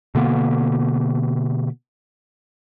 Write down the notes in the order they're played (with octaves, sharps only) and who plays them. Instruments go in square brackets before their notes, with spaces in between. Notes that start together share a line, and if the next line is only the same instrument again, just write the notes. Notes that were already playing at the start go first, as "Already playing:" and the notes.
[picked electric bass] B2 D3 A#3 B3